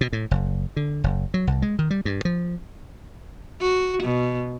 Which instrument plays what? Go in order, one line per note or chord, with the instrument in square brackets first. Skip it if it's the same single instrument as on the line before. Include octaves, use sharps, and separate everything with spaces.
[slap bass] B2
A2
F#1
D3
F#1
F#3
C2
G#3
D#3
G3
G2
F3
[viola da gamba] F#4
B2